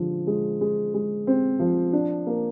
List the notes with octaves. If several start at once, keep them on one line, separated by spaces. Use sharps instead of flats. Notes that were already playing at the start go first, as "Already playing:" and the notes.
Already playing: D3 F3 G#3
G#3
G#3
G#3
C4
F3
D4
A#3